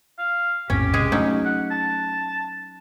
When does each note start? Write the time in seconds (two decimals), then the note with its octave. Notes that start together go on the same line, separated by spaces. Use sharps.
0.19 F5
0.70 A#1 F2 A2 C#4 G4
0.94 C3 G#3 G#4
1.12 F#3 A3 C#4 D#4
1.45 F#5
1.71 A5